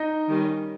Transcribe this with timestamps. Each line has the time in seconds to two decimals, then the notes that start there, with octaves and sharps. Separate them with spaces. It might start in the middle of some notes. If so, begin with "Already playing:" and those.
Already playing: D#4 D#5
0.29 D#3 G3 C#4